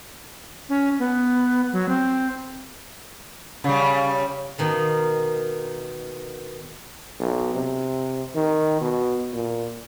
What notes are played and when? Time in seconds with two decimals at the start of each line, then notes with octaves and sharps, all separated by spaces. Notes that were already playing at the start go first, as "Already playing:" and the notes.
0.69 C#4
0.99 B3
1.73 F#3
1.89 C4
3.64 C#3 G3
4.58 B2 D#3 A#3
7.19 B1
7.55 C3
8.35 D#3
8.81 B2
9.33 A#2